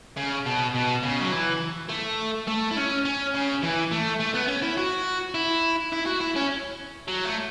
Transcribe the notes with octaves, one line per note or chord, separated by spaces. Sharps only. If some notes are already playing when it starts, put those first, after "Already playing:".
C#3
B2
B2
C#3
F#3
E3
A3
A3
E4
C#4
C#4
C#3
E3
A3
A3
B3
C#4
E4
F#4
E4
E4
F#4
E4
C#4
F#3
A3